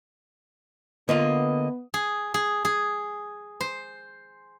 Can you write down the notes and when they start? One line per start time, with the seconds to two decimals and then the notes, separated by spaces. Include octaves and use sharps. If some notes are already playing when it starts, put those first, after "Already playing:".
1.09 D3 A#3 B3 F4 D#5
1.94 G#4
2.34 G#4
2.65 G#4
3.60 C5